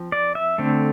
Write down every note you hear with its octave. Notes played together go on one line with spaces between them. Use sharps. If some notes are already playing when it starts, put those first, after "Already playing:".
Already playing: F3 C4
D5
E5
D3 A3 C4